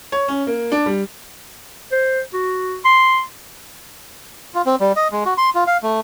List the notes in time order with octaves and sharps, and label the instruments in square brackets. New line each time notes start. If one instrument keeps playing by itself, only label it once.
[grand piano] C#5
C#4
A#3
D4
G3
[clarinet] C5
F#4
C6
[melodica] F4
C4
G3
D#5
G#3
F#4
C6
F4
F5
A3